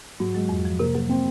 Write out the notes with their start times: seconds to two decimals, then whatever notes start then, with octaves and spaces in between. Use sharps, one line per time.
0.20 G#2 F#3
0.34 F#3 G#3
0.49 F2
0.65 F3
0.79 C3 A#3
0.95 F#3 A#3
1.09 C4